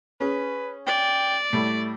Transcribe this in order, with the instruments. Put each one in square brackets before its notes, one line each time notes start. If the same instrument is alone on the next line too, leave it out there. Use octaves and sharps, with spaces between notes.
[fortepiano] C#4 G#4 [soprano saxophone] B4
[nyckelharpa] D5 [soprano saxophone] G5
[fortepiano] A2 G3 [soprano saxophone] A3